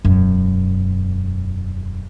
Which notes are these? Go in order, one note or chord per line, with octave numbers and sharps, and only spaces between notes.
E1 F#2